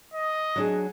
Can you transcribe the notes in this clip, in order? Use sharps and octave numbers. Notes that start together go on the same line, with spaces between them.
D#5
F#3 D4 G#4